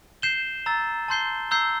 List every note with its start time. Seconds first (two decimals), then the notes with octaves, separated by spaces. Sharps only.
0.22 G6 C7 E7 G7
0.66 A#5 E6 A6
1.08 A5 C6 G6 C7 G7
1.51 A#5 E6 G6 C7 G7